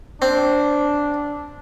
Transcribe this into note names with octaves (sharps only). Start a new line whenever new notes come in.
C4 D4